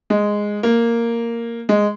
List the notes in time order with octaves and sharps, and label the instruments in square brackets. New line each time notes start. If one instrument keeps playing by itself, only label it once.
[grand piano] G#3
A#3
G#3